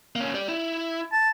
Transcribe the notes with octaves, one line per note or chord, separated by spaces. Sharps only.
A#3 C#4
G4 D5
E4
A5